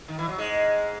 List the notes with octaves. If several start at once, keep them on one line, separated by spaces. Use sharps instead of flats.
D#3
E3
F#3
G#2 G#3